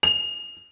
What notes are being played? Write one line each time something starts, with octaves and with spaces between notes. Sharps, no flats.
F7